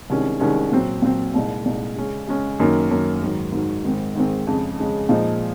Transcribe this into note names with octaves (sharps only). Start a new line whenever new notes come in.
C2 C3 D#3 G#3 C#4
C2 C3 D#3 G#3 C#4
A#2 F#3 C4
A#2 F#3 C4
C2 A#2 G#3 D#4
C2 A#2 G#3 D#4
C#3 G#3 C#4
C#3 G#3 C#4
F#2 D#3 A#3
F#2 D#3 A#3
G#2 D#3 F#3
G#2 D#3 F#3
G#2 D#3 G#3 C4
G#2 D#3 G#3 C4
F2 C#3 G#3
F2 C#3 G#3
A#2 F3 G#3 D#4